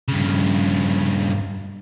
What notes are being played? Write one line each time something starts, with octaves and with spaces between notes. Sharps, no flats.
G2 C#3